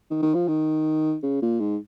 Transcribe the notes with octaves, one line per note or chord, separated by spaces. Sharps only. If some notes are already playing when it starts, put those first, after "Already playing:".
D#3
D#3
F3
D#3
C#3
A#2
G#2